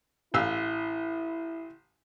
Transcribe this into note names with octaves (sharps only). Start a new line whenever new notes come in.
A1 E4 F5 E6